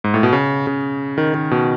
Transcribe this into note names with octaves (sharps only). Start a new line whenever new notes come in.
G#2
A2
B2
C#3
C#3
D#3
D#3
B2